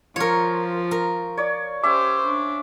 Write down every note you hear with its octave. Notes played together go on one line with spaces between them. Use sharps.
F3 F4 A#4 C#5 C#6
A#4
C#5 D5
C#4 G4 C5 E5 D6
D4